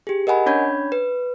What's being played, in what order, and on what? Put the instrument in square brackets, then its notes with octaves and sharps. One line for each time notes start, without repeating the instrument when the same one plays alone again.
[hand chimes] G4 G#4
A#4 D#5 F#5 G#5 B5
C#4 D4 C#5 B5 G6 G#6
B4